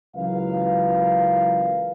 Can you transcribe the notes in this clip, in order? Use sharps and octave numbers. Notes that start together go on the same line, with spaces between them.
C#2 E3 F#3 A#4 B4 F5